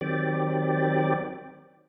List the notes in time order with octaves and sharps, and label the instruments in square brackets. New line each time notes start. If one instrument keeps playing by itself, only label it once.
[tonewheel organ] D#3 F#3 C4 G4 D5